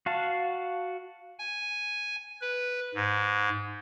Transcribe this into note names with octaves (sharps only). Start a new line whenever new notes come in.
F#4 F5 A5
G#5
B4
G#2